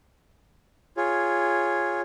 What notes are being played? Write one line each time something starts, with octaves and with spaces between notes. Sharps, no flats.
F4 G#4 C#5